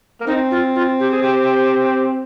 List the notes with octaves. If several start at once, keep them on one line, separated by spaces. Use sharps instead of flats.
A#3
C4 D#4
F4
F4
G4
G#4
G4